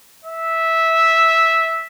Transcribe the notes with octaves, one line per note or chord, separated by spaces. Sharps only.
E5